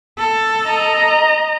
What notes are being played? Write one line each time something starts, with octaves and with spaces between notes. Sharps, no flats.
A4
D#5 A#5